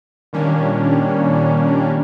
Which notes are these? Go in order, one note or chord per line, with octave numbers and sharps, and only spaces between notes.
A#2 D#3 G3 A#3 C#4 D4